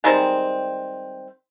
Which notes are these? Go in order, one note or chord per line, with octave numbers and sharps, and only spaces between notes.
D#3 G3 G#3 C4